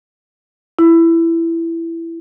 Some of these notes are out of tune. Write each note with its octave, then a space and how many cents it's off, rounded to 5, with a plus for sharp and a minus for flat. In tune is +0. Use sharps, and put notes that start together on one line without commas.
E4 +15